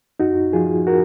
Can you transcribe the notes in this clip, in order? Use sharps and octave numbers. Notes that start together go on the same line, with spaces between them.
F#2 D#4 F#4
F3 F4 G#4
F#4 A#4